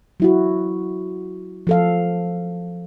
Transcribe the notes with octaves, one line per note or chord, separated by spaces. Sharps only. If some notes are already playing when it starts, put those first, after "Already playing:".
F#3 E4 F#4
F3 A4 F5